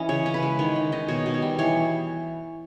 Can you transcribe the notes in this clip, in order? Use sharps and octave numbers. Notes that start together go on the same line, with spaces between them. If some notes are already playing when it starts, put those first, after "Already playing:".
Already playing: E3 C#4 D#5
C#3 C#5
C#4
B4
G#3
D#3 C#5
D#3
D#3 D#5
B2 C#5
B2
C#5
G3
E3 C#5